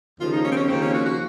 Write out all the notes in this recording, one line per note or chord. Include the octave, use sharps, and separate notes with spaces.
D#2 C#3 F3 A#3 F4
D#4
C#4
C4
C#4
D#2 C#3 F3 A#3 C4
C#4
F#4
F#4